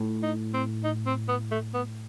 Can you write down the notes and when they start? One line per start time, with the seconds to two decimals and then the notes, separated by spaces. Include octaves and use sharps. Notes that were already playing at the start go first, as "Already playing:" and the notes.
Already playing: A2
0.23 D#4
0.54 C4
0.84 D#4
1.06 C4
1.29 B3
1.51 A3
1.74 B3